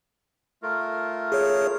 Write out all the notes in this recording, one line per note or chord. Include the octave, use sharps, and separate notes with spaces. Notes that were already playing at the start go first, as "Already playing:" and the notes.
A3 F4 A#4
G#4 C#5